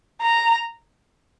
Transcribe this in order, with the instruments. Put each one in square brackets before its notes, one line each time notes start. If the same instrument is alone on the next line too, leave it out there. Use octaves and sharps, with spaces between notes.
[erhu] A#5